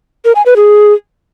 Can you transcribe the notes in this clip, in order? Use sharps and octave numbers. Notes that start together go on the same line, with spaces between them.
A#4
G#5
B4
G#4